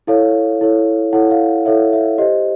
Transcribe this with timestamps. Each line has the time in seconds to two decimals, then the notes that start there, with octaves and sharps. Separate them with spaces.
0.07 E4 A4 C#5 F5
0.61 E4 A4 C#5
1.13 E4 A4 C#5 F#5
1.31 F5
1.65 E4 A4 C#5 E5
1.93 E5
2.18 G4 C5 D#5